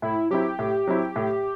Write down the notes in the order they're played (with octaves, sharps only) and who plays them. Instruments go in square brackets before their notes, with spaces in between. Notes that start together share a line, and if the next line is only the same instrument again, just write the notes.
[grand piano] A2 [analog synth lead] E4
[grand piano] F#3 C4 E4 [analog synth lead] G4
[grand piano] A2
F#3 C4 E4
A2